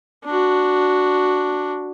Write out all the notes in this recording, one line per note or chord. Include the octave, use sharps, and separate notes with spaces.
D4 F#4